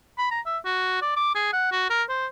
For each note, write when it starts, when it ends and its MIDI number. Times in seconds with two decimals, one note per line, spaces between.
0.18 0.27 83
0.31 0.40 82
0.46 0.58 76
0.65 1.00 66
1.02 1.13 74
1.17 1.32 86
1.35 1.51 68
1.53 1.71 78
1.72 1.87 66
1.90 2.03 70
2.09 2.26 72